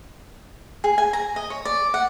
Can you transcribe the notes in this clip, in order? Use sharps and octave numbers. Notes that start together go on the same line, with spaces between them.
G#4
G#5
A#5
D#5
C#5
D5
F#5